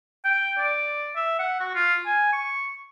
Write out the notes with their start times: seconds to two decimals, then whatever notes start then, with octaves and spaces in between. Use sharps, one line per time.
0.25 G5
0.58 D5
1.16 E5
1.39 F#5
1.60 F#4
1.75 F4
2.06 G#5
2.33 C#6